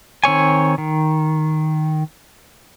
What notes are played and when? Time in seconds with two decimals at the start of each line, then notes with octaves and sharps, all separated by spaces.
0.24 D#3 C4 C#5 G#5
0.78 D#3